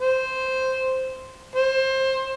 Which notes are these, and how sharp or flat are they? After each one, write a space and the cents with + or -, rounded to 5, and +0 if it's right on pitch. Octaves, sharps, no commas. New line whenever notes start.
C5 -5
C5 +20